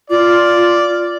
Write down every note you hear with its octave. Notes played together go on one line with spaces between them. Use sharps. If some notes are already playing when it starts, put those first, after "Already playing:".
F4 D5